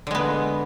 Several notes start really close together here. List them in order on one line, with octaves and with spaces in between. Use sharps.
D3 G#3 B3